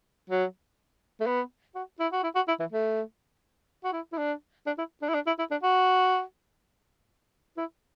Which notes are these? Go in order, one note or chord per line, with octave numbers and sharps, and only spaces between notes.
F#3
A3
B3
F#4
E4
F#4
E4
F#4
E4
E3
A3
F#4
E4
E4
D4
D4
E4
D4
E4
D4
E4
E4
D4
F#4
E4